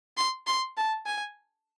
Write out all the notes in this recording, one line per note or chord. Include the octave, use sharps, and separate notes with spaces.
C6
C6
A5
G#5